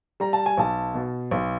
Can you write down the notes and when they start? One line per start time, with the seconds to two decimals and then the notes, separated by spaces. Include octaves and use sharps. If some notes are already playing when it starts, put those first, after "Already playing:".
0.20 G3 A#5
0.33 A5
0.46 G#5
0.58 B1 A5
0.94 B2
1.31 B1